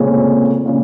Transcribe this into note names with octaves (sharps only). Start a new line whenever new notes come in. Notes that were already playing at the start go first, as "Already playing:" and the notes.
Already playing: F1 F2 A#2 C#3 G#3 C#4
A#2 C#3 G#3